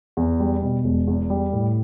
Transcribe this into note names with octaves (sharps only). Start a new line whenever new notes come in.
E2
G3
B2
E1
E2
G3
A2